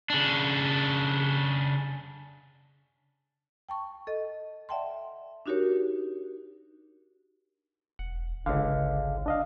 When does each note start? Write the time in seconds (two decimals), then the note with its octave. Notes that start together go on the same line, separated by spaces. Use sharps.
0.10 C#3 D4
3.69 G5 A5 C#6
4.07 A4 D#5
4.69 D5 E5 F#5 G5 A5 C6
5.46 D4 D#4 F#4 G4 A#4 C#5
7.99 E1 F#5
8.46 G#1 C#2 D3 F5
9.26 D4 D#5 F5